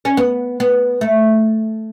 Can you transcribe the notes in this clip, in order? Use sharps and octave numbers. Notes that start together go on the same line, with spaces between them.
C#4
B3
B3
A3